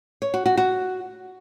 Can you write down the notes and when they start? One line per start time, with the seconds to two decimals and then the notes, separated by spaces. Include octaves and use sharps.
0.22 C#5
0.34 F#4
0.46 F#4
0.57 F#4